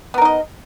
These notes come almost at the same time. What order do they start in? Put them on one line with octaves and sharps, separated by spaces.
B3 A#4 D#4 D#5